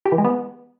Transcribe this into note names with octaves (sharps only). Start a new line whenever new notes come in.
G4
E3
G#3
B3